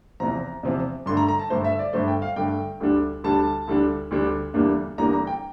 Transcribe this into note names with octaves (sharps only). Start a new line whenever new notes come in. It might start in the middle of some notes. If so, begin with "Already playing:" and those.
E2 C3 F3 A#5
E2 C3 F3
G2 D3 A3 C6
A#5
A#5
A5
G2 D3 A3 C5
E5
D5
G2 D3 A3 C5
G5
F5
G2 D3 A3 G5
D2 D3 G3 D4
D2 D3 G3 D4 A5
D2 D3 G3 D4
D2 D3 G3 D4
E2 D3 G3 A#3 D4
E2 D3 G3 A#3 D4 A#5
A#5
G5